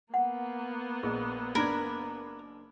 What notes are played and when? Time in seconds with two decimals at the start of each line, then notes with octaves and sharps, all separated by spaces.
0.14 A#3 B3 F#5
1.03 A#1 G#4 D#5
1.55 F#1 D4 A#4 B5 G#6